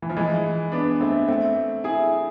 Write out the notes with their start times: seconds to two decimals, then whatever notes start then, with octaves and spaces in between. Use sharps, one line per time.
0.02 E3
0.09 F3
0.17 E3 G#3
0.72 B3 D4
1.00 A3 C4
1.29 A3 C4
1.84 E4 G#4